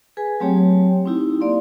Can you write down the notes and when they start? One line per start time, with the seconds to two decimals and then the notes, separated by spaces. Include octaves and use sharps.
0.17 G#4 B4 G#5
0.40 F#3 A3 C4 G4 C#5 G5
1.06 C4 D#4 E4 G4
1.41 A#3 D5 F5 C6